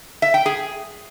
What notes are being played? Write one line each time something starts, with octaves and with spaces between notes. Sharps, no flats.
E5
G5
G#4